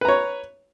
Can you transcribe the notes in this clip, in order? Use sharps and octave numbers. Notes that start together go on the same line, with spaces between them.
B4 C#5 A#5